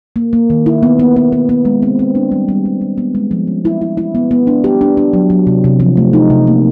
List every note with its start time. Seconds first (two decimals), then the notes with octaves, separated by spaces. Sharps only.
0.16 A#3
0.33 A#3
0.50 D#3
0.66 E4
0.83 B3
1.00 B3
1.16 B3
1.32 B3
1.49 B3
1.65 G#3
1.83 C4
1.99 C4
2.15 D4
2.32 G3
2.49 G3
2.65 G3
2.81 G3
2.98 B3
3.15 G#3
3.31 F3
3.47 C#4
3.65 E4
3.81 E4
3.97 E4
4.15 B3
4.31 B3
4.47 D4
4.64 G4
4.81 D4
4.97 D4
5.13 F#3
5.30 F#3
5.47 C3
5.64 C3
5.80 F3
5.97 A3
6.13 D#4
6.30 C3
6.47 A#3